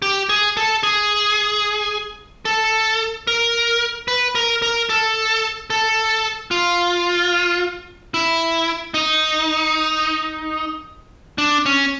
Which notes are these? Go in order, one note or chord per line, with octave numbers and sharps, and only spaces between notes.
G4
G#4
A4
G#4
A4
A#4
B4
A#4
A#4
A4
A4
F4
E4
D#4
D4
C#4